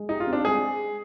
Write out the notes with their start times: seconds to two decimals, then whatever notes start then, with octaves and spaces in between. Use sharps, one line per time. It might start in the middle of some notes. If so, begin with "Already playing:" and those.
Already playing: G#3
0.09 D#4 G4
0.20 F4
0.27 C4
0.33 D4
0.44 G#3 G#4